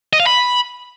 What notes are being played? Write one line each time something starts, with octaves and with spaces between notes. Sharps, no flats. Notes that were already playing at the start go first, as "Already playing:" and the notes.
D#5
F5
B5